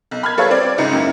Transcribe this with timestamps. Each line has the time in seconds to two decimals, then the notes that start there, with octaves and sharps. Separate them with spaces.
0.11 B1
0.23 B5 F6 G#6
0.37 G3 A4 B4 C#5 F5
0.51 C4 D5
0.78 C#2 G#2 C#7
0.92 F#2 A#3 E4